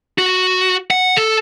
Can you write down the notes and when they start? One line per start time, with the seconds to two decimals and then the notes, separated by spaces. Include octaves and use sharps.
0.18 F#4
0.91 F#5
1.17 A4